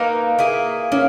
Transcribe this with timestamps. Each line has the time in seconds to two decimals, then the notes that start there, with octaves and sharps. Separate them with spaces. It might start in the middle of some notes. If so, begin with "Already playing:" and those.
Already playing: A#3 D#4 A#4 B4
0.39 A#3 E4 G#4
0.92 A#3 C#4